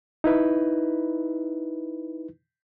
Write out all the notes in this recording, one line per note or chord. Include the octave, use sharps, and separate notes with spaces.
D#4 E4 B4